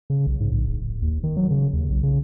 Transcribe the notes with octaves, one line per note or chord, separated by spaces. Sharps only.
C#3
B1
G#2
A#1
D1
D#2
D#3
F#3
C#3
D#2
B1
C#3